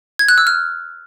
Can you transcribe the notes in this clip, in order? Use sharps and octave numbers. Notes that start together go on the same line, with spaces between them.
G#6
F#6
E6
F6